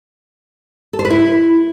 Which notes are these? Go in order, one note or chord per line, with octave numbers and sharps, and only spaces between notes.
A4
C5
B4
E4